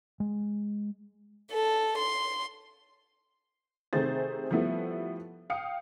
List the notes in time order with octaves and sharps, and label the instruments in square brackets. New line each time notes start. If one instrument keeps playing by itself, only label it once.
[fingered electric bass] G#3
[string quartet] A4
C6
[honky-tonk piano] C3 D#3 A3 G#4 C5 A6
F3 G3 A3 B3 E4
F5 G5 D#6 C#7